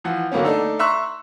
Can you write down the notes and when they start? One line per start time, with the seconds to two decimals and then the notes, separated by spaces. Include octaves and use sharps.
0.04 E3 F3 F#5
0.31 D3 F#3 A#3 B3 C#4
0.44 A3 D4 D#4 A4
0.79 E5 A#5 C6 C#6 E6 F#6